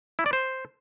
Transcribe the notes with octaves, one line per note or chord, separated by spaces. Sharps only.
E4
D5
C5